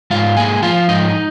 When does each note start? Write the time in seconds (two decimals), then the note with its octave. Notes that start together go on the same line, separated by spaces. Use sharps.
0.11 G#2 F4 F5
0.37 A#3 G#4 G#5
0.63 F3 F4 F5
0.88 G#2 D#4 D#5